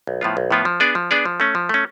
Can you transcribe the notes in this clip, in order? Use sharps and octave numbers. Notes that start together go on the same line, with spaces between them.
B1
A2 F3 B3 F4
B1
A2 F3 B3 F4
F3
B3 D4 G#4 D5
F3
B3 D4 G#4 D5
F3
A3 C#4
F3
A3 C#4